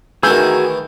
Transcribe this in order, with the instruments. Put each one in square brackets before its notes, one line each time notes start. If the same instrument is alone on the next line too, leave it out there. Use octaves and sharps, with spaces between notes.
[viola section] D#3 A#4 [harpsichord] E3 A3 [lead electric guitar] F#4 G#4 [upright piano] E6 G6